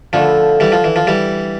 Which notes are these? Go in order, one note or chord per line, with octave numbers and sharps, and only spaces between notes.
D3 F3 A3 E4
E3 G3
F3
E3
F3
E3 G3